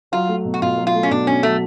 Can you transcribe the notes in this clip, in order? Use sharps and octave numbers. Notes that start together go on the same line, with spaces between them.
F#3 F4
A3
B2
F#4
B2 F4
F#3
F4
A3
C#4
B2 D4
B2 C#4
F#3 A3